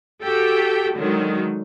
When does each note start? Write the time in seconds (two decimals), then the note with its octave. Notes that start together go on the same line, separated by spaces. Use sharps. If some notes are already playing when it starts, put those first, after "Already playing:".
0.23 F#4 G4 A4 G5
0.97 D3 D#3 F#3 G#3